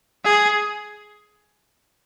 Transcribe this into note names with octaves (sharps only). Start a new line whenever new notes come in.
G#4